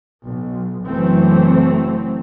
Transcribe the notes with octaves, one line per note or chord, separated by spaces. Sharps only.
B1
F#1 F#2 E3 F#3 A3 C4